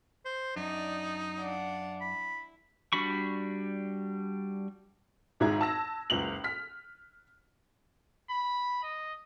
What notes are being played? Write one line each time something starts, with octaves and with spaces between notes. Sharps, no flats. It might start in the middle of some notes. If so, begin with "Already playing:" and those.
C5
F#2 D4 D#4 D5 D#5
D4 F5 F#5
E4 B5
G3 D4 F#4 B5 C#6
G#1 G#2 E4 G#4 A#5 G#6
A5 E6 A#6
F#1 C#2 F7 F#7
F6 B6
B5
D#5